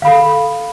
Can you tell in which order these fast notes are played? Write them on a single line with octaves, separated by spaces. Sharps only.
F5 B5 A4